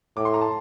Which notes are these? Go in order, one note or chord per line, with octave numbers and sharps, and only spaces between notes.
A2 D6
C6
A#5
A5